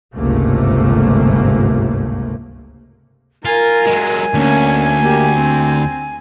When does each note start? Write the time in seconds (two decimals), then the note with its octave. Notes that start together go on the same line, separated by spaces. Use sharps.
0.15 G1 C#2 G#2 C3 A3 A#3
3.45 F4 A#4 G#5
3.87 F#3 G#3
4.34 D2 A#3 C#4
5.02 A#3 G4
5.35 C4